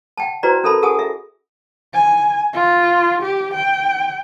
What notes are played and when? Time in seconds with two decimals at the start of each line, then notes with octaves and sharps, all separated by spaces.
0.17 F#5 G5 A5
0.43 E4 F#4 B4 C5 D5 A#5
0.63 C#4 A4 A#4 E5 A5 B5
0.82 G#4 A#4 F#5 G#5 A5 D#6
0.99 E5
1.94 G#5
2.53 F4
3.22 G4
3.54 G5